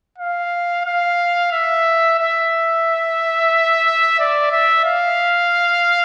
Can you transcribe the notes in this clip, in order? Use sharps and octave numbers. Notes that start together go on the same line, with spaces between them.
F5
F5
E5
E5
D5
E5
F5